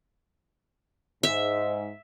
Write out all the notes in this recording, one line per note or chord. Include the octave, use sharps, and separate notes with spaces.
G#2 E5